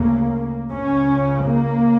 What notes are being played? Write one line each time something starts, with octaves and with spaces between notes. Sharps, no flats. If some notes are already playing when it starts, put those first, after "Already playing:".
Already playing: D2 C#3 A#3
C#2 C#3 C#4
A#3